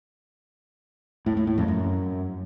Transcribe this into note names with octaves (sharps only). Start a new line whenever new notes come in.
A2
A2
A2
F2
F#2